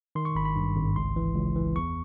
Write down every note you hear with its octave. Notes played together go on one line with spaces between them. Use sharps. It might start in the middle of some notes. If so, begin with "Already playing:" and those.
D#3 C6
C#6
G#1 B5
B5
G2
G#1
C#2 C6
E3
C#2
E3
E2 C#6